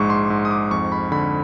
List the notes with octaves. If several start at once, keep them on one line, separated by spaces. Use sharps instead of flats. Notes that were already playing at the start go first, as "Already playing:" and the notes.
Already playing: A#1 G#2 G#3 C#6 D6
C6
G#2
D#6
D6
F2 C#6
B5
D3 B5